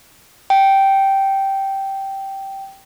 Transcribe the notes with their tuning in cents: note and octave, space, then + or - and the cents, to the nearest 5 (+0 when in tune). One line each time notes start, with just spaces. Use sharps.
G5 -10